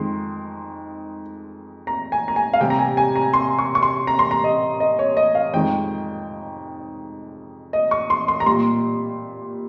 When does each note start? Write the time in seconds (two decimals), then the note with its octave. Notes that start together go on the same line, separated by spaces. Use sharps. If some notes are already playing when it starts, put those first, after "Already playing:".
Already playing: F2 D#3 G#3 C6
1.87 A#5
2.12 G#5
2.28 A#5
2.36 G#5
2.53 F5
2.61 C3 G3 G5
2.70 A#5
2.79 G#5
2.97 G#5
3.16 A#5
3.33 C6
3.59 C#6
3.75 C#6
3.83 C6
4.07 A#5
4.19 C6
4.31 A#5
4.44 D#5
4.80 D#5
4.99 C#5
5.17 D#5
5.35 F5
5.53 F2 D#3 G#3 G5
7.73 D#5
7.91 C#6
8.10 C6
8.28 C6
8.40 A#5
8.46 A#2 G3 C6